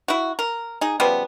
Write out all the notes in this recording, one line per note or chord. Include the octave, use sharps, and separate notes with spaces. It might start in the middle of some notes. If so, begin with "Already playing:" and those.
E4 F#4
A#4
D#4 G#4
C#3 F3 G3 B3